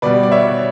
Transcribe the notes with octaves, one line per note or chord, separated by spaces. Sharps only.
B2 G3 B4 D5
D5
C#5 E5